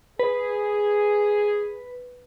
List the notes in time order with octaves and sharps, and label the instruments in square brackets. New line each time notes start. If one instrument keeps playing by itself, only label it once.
[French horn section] G#4 [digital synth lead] B4